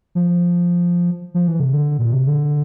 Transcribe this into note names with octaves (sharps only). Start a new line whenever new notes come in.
F3
F3
E3
C3
D3
A#2
C3
D3